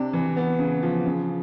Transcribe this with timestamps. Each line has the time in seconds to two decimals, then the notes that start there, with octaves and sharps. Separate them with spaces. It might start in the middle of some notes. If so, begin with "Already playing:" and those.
Already playing: C3 D4
0.13 E3
0.36 B3
0.59 C#3
0.83 F3
1.06 C#3